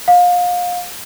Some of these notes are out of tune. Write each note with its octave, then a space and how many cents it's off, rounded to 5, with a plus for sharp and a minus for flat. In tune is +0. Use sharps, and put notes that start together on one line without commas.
F5 +30